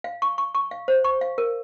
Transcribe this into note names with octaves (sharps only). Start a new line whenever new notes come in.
F5
C#6
C#6
C#6
F5
C5
C#6
F5
A#4